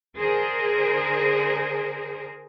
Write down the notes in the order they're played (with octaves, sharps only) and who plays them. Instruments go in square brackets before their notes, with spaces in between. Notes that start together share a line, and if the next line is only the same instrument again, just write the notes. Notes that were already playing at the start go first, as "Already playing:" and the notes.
[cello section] D3 G#4 A#4 C5